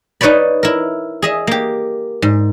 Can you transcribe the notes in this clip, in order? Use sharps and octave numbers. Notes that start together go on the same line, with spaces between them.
D#4 B4 C#5 D5 B5
E4 A#4
G#4 D#5 E5
A#3 G4
G#2